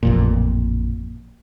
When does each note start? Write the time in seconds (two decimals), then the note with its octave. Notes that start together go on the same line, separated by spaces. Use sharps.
0.03 A1 F2 A#2